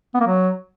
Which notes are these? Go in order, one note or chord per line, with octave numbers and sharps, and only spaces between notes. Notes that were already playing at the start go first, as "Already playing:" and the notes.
B3
A#3
F#3